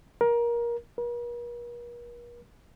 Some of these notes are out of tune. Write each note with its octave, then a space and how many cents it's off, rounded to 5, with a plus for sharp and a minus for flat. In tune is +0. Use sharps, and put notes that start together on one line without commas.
A#4 +20
A#4 +45